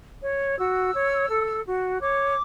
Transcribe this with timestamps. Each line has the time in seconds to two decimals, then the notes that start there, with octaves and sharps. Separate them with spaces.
0.22 C#5
0.57 F#4 E6
0.93 C#5
1.29 A4
1.65 F#4
2.00 C#5 D6